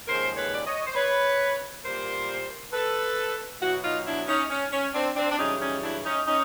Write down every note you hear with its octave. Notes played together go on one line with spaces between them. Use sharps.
D#2 C#3 F3 G#3 A#4 C5
B4 C#5
D5
C#5 D#5
C5
B4 C#5
A#2 G3 A#3 A#4 C5
A4 B4
B2 F#3 B3 E4 F#4
D#4 F4
D4 E4
C#4 D#4
C#4
C#4
C4 D4
C4 D4
D4
F#2 C#3 E3 G3 C#4 D#4
C#4 D#4
D4 E4
C#4 D#4
C#4 D#4